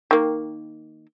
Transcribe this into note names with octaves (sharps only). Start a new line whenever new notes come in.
D#3 A#3